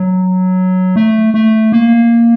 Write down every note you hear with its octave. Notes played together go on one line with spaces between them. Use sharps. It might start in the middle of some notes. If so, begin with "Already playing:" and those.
Already playing: F#3
A3
A3
A#3